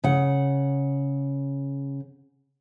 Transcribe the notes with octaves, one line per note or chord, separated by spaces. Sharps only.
C#3 F#5